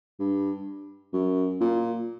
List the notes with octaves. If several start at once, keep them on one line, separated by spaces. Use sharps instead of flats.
G2
F#2
A#2